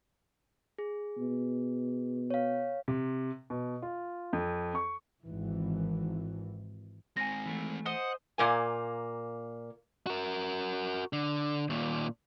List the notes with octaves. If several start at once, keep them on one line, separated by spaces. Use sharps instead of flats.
G#4
B2
C#5 F5
C3
B2
F4
F2
C#6
G#1 E3
G#3 C4 G#5 A#6
E3 A3
C5 D#5 F#5
A#2 A#3 G#5
F#4 A#4
D3
D#2 A#2